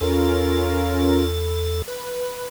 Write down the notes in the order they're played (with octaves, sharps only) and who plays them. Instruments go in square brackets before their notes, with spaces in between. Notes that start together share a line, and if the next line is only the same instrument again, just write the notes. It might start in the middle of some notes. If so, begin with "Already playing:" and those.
[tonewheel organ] E2 A4 [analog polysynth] C#4 F4 A#4
[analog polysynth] B4